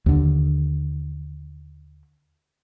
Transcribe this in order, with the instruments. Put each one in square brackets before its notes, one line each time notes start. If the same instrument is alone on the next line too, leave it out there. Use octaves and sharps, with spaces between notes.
[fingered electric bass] D#2 D3